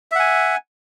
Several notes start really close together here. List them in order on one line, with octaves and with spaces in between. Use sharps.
E5 F#5 G#5